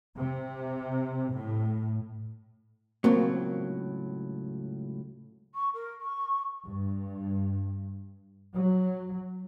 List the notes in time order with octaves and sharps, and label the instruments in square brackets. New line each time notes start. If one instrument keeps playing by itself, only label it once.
[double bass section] C3
A2
[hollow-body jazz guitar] C#2 A2 F#3 [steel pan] A#3 C4
[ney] C#6
A#4
C#6
[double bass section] G2
F#3